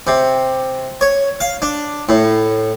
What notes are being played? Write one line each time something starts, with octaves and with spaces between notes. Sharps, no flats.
C3
C#5
F5
D4
A2